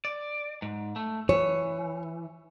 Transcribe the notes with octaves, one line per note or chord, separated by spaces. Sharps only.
D5
G#2
A3
E3 C#5